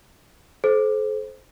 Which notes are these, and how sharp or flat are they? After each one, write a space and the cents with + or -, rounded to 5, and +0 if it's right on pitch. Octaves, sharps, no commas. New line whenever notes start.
A4 -40 C5 +0